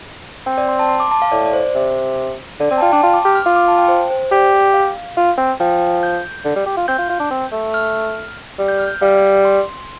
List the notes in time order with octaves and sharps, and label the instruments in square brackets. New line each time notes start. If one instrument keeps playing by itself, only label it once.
[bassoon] C4 [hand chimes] G5
[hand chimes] D5
C6
A5
C6
D6
A5
F5
[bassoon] A2 [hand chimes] D5
[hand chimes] D5
C5
[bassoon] C3
[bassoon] D3 [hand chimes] D5
[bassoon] C4 [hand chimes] D5
[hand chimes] A5
[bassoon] F4 [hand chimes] G5
[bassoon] D4 [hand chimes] A5
[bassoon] F4 [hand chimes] C6
[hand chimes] D6
[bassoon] G4 [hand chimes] F6
[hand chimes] F6
[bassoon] F4 [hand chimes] D6
[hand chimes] D6
A5
G5
C5
C5
[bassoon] G4 [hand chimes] D5
[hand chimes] F5
[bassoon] F4
C4
[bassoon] F3 [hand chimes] G5
[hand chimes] G6
[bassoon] D3
G3
G4
F4
[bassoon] C4 [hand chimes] G6
[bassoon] F4
F4
D4
C4
A3
[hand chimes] F6
[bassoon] G3
[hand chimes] G6
F6
G6
[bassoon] G3 [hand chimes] F5
[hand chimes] D5
C6